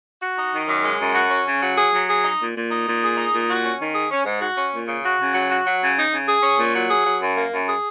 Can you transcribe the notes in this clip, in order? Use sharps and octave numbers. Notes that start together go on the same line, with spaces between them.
F#4
D#4
D#3
F#2
G#3
F#2
F#4
C#4
C#3
F#3
G#4
F#3
G#4
D#4
A#2
A#2
D#4
A#2
G#4
D#4
A#2
F#4
C#4
D#3
G#4
C#4
G#2
F#4
C#4
A#2
C#3
F#4
C#3
F#3
F#4
F#3
C#3
D#4
C#3
G#4
C#4
A#2
F#3
G#4
F#3
F#2
A#3
F#2
G#4